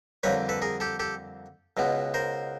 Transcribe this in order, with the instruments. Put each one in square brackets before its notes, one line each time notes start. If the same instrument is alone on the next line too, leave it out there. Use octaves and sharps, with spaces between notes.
[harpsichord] F2 D3 G3 A#3 B4 C#5
A4 B4
G#4 A#4
G4 A4
G4 A4
C#2 B2 G#3 B3
A#4 C5